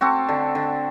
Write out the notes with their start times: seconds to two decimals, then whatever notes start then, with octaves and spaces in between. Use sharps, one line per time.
0.01 C4 F#4 A4
0.29 D3
0.55 D3